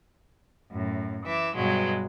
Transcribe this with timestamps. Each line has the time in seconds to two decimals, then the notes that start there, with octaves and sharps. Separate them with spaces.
0.71 F#2 A2
1.23 E3 E5 D6
1.55 G2 B2 F#3 G#3